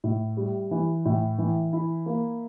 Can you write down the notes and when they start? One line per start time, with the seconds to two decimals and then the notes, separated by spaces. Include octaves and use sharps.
0.04 A2
0.37 G3
0.71 E3
1.05 A2
1.38 E3
1.73 E4
2.06 A#3